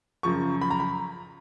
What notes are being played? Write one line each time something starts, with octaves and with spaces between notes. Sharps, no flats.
F#2 C#3 F3 C#6
B5
A#5
B5